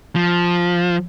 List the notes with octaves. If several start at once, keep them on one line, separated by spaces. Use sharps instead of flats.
F3